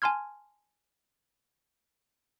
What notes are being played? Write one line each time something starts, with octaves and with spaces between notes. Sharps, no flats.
G#5 A5 C6 F6 G#6